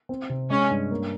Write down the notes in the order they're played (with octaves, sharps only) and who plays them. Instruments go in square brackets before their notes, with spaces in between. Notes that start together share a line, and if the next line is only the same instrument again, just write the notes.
[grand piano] C4
C3
[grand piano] G#3 [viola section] C#4
[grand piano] G2
A#3